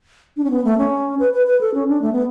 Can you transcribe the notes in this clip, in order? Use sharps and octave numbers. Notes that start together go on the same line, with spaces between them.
D4
C#4
B3
A3
C#4
B4
B4
B4
A4
C#4
D4
A3
B3